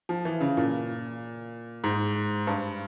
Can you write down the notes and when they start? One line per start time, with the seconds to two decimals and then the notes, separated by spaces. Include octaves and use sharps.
0.09 F3
0.25 E3
0.41 C#3
0.57 A#2
1.84 G#2
2.47 G2